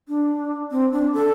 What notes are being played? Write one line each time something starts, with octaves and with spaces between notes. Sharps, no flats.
D4
C4
D4
A4